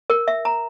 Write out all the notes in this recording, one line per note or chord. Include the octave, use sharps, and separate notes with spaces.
A#4
E5
A#5